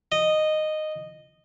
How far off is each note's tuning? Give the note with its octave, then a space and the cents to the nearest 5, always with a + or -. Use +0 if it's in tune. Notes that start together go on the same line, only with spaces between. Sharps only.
D#5 -10